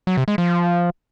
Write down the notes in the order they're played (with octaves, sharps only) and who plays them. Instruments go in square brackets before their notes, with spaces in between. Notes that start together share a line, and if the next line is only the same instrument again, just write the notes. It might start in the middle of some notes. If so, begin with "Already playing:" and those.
[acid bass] F#3
C3
G#3
F3